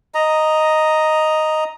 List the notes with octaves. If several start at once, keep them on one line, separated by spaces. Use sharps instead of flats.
D#5 A#5